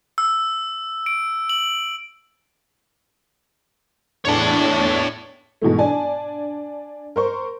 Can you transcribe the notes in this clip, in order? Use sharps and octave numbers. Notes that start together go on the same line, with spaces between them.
E6
D7
F#7
E2 A2 D4 C#5 A5
G#2 B2 E3 A3
D4 G#5 A5
A#4 C5 C#6